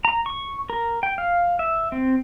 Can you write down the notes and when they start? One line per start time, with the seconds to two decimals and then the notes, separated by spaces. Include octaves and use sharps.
0.05 A#5
0.26 C#6
0.70 A#4
1.03 G5
1.18 F5
1.59 E5
1.92 C4